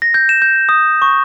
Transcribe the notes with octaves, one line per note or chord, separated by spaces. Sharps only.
A#6
G6
E7
G6
D#6
C#6